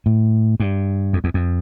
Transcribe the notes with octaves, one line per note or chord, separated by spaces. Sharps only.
A2
G2
F2
E2
F2